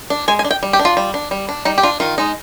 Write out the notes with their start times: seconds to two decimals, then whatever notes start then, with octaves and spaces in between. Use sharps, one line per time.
0.10 D4
0.28 G#3 G#5
0.39 G#5
0.44 D4
0.51 G5
0.63 G3
0.73 G4
0.79 D4
0.85 F4
0.97 G3
1.14 D4
1.31 G3
1.49 D4
1.65 G3 D#4
1.78 G4
1.83 D4 F4
2.00 D#3 F4
2.18 G#3 D#4